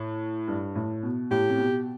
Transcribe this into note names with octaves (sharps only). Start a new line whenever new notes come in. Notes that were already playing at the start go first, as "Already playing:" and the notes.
Already playing: A2
G2
A2
B2
A2 G4
C3
B2